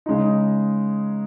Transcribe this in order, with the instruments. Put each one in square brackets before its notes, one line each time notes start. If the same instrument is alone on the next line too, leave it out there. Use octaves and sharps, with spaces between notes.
[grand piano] C#3 G#3 D#4